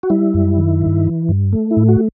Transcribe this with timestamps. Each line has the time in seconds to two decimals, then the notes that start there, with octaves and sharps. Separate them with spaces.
0.03 F#4
0.10 G3 E4
0.34 F#2
0.58 D#3
0.82 G2
1.05 E3
1.29 G2
1.53 A3
1.71 E4
1.77 A2
1.88 F#4